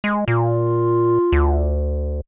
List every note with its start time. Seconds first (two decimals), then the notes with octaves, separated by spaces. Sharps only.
0.04 G#3
0.28 A#2 F4
1.32 D2